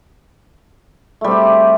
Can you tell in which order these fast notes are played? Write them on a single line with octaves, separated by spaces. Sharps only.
A3 G3 C4 G4